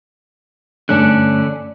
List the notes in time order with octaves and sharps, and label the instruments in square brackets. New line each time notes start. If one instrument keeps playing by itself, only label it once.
[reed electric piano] G2 A3 F#6 [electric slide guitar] D3 C#4 D4